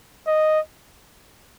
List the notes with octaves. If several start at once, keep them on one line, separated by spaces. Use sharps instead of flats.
D#5